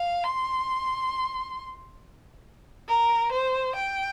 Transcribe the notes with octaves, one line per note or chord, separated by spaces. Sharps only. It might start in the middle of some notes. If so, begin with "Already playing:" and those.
Already playing: F5
C6
A#4
C5
G5